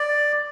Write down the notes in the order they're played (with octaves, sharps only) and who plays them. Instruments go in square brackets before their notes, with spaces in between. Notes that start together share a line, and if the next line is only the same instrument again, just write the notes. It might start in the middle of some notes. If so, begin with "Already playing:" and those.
Already playing: [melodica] D5